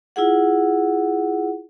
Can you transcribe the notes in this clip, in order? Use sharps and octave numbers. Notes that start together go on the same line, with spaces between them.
E4 F4 G#4 F#5